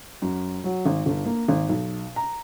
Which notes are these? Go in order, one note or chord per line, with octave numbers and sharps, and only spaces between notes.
F#2
F#3
G#1
G1
A#3
G#1
B1
A#5